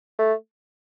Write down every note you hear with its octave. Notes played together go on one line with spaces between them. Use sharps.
A3